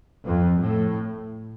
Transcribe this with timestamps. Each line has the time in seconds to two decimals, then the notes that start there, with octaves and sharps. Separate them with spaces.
0.24 F2
0.61 A2